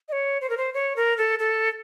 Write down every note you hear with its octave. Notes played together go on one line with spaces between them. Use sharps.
D#5
C#5
C5
A#4
C5
C#5
A#4
A4
A4